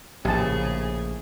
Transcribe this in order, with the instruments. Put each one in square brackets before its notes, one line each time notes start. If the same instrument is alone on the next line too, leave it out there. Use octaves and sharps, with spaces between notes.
[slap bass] A#1 [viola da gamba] A2 C#3 G#4 [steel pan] G4 A5